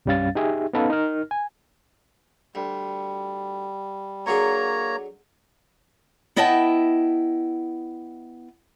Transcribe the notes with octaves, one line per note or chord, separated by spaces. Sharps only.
C2 G2 G3 C#4 F5 A6
D#4 G4 G#4 E5
B3 C#4 D#4 A4 B4 F5
D#4 A#4 F6
G#5
D2 G3
D3 F#3 A#3 G#4 C#5 A#5
B3 E4 D#5 E5 G5 A5